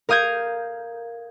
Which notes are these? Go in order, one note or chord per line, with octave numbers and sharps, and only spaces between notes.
A#4 F5 D#6 G6 G#6